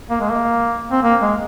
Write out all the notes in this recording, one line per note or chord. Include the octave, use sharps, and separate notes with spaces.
A#3
G#3
A#3
C4
A#3
G#3